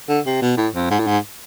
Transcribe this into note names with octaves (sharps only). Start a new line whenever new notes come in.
D3
C3
B2
A2
F2
G#2
A2
G#2